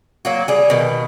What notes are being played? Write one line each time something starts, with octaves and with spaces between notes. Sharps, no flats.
F#3 A#3 F#4
G3 G#4
B2 D#3